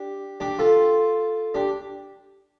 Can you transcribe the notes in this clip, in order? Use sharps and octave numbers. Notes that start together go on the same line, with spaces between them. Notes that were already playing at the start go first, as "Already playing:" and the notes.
Already playing: D4 G4
D4 G4
F4 A4
D4 G4